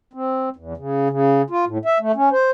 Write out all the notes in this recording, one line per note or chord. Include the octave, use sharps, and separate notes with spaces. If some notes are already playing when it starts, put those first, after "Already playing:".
C4
E2
C#3
C#3
F4
A2
E5
A3
C#4
C5